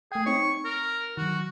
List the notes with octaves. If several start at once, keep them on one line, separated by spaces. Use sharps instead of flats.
A3 G#4 G5
C4 D#4 C#5 C#6
A#4
D#3 F#3 F#4